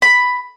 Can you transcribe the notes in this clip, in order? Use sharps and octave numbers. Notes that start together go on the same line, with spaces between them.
B5